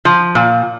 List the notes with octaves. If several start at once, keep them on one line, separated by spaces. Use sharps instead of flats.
F3
A#2